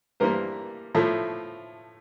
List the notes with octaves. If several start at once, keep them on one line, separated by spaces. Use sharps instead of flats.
G2 E3 G3 A#3 A#4 C5
A2 F3 A3